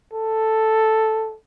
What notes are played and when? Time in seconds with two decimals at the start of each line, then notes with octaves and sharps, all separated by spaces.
0.13 A4